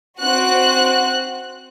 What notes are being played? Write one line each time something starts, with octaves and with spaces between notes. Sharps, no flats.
C4 F#4 F#6